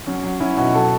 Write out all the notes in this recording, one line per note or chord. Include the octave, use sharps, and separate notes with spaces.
F#3 C#4
F#3
F#3 C#4 E4
B2 D#4 F#4
F#3 F#4 A4